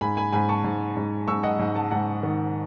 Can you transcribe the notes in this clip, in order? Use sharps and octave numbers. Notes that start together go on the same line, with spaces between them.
G#2 G#5 B5
G#5 B5
G#2 G#5 B5
A5 C#6
G#2
G#2
G#2 C#6 E6
D#5 F#5
G#2
F#5 A5
G#2 F#5 A5
D#3